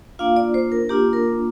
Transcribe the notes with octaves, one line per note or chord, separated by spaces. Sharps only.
A#3 D4 F4 F5
D5
C5
A#4
A#3 D4 F4 G4
A#4